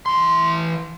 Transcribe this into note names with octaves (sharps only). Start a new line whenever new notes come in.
E3 C6